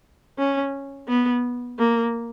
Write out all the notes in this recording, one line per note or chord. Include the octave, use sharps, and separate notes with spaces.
C#4
B3
A#3